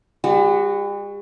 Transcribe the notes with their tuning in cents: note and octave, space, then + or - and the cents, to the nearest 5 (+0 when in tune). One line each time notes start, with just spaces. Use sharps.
G3 +45 F#4 +0